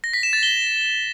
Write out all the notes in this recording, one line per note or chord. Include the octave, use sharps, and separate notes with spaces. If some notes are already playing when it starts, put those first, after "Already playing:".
A#6
B6
E7
A6
G7